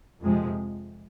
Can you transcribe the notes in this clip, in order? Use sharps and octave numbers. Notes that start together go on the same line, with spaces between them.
F2 C3 F3 G#3